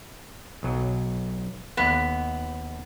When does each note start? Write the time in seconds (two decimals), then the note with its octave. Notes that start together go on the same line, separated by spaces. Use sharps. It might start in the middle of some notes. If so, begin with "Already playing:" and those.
0.63 B1 F#3
1.77 D#2 B3 F5